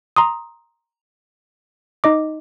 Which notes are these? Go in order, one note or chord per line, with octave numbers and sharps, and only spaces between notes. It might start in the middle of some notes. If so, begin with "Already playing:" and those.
A#5 C6 D#6
D#4 D#5 D6